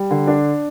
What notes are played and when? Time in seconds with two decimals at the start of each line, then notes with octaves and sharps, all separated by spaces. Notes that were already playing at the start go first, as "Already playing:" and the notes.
Already playing: G3
0.11 D3
0.27 D4